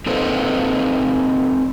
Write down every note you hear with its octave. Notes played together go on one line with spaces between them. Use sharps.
C4 D#4 A4 B4 C5